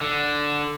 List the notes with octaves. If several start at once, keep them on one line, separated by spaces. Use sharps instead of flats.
D3